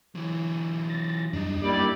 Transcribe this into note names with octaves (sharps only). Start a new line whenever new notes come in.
E3 F#3
A6 A#6
F#2 G3 D4 D#4
G3 A#3 E4 D5